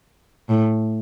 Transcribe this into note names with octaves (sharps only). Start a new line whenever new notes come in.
A2